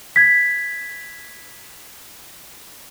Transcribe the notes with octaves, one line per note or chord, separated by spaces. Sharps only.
G#6 B6